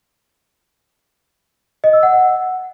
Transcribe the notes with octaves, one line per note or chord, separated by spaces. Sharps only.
D#5
E6
F#5